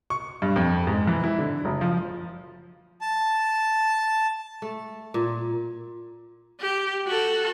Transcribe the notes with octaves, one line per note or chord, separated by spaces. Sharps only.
C#6
G2
F2
G#2
E3
E4
D3
F#1
F3
A5
A3
A#2
G4
F#4 A4